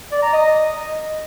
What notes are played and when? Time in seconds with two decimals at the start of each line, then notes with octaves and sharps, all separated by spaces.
0.11 D5
0.22 A#5
0.33 D#5